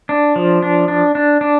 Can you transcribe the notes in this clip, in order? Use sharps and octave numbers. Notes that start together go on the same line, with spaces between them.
D4
F3
D4
D4
D4
D4